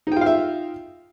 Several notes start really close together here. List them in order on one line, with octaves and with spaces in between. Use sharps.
D#4 G5 F4 F5 E5